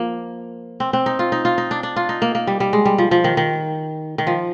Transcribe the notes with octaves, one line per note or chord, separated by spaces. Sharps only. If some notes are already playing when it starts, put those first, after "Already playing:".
Already playing: F3 A#3
C4
C4
D#4
F4
D#4
F4
D#4
D4
D4
F4
D#4
A#3
A#3
G3
G3
G#3
G3
F3
F3
D#3
D#3
D#3
F3